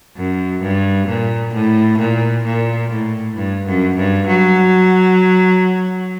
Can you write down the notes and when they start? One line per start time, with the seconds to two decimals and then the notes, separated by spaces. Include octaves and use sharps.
0.17 F#2
0.62 G2
1.08 A#2
1.54 A2
1.99 A#2
2.45 A#2
2.90 A2
3.37 G2
3.67 F#2
3.97 G2
4.28 F#3